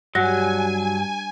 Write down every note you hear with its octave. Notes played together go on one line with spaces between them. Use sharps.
G2 F#3 F#5 G#5 F#6 A#6